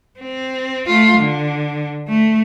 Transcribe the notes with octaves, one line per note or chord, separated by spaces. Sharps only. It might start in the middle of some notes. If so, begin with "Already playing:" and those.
C4
A3 F4
D3
A3